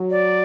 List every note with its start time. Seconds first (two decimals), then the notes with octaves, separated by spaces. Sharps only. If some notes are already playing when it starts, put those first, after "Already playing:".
Already playing: F#3
0.11 D5